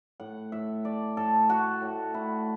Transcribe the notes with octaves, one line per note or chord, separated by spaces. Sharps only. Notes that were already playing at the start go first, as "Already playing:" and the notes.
A2 F#5
A2 E5
A3 D5
A2 A4
A3 F#4
A2
A3 E4